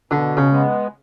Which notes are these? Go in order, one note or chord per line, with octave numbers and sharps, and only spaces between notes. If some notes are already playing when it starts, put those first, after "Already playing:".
B2 D3
C#3
G#3 B3